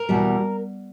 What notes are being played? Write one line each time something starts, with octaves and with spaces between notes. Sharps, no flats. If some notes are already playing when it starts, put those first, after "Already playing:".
Already playing: A#4
E2 B2 G3